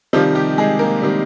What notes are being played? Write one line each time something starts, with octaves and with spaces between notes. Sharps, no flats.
C3 D#3 F3 G3 F4
G3 G4
G#3 G#4
A#3 A#4
C3 D#3 G3